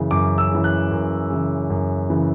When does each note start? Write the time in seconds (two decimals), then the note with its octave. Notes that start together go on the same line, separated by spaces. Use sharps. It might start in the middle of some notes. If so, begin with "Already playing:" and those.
Already playing: F#2 C#3 E3
0.11 F#2 D6
0.38 E6
0.51 C#3 E3
0.64 F#6
0.91 F#2
1.30 C#3 E3
1.70 F#2
2.10 C#3 E3